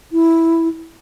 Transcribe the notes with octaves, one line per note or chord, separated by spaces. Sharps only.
E4